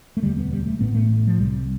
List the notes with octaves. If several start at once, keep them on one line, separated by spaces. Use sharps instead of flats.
A3
E1 D2 D3 G3
B3
G3
A3
A1 A2 B3
A3
F3
C2 C3 G3